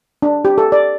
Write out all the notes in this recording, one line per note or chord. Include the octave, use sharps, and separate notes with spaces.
D4
G4
A4
D5